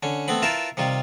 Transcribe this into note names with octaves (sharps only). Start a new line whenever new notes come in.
D3 C#4
A3 B3 C4 B5
E4 F4 A#4 B4 E5 A5
C3 D#3 G3 F4